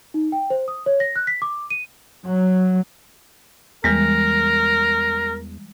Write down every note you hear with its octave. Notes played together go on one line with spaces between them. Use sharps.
D#4
G5
C5
D#6
C#5
A#6
F#6
B6
D6
D#7
F#3
E2 E3 G3 G#3 A#4